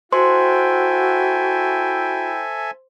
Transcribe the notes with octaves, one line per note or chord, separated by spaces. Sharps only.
E4 F#4 A4 C5 E5 G5 G#5 C6